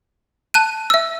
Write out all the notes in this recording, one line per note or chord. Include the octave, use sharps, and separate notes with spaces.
A5 F#6 D#7
E5 E6